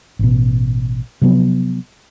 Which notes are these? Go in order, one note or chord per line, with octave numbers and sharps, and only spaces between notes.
A1 B2
C3 F3 F#3 B3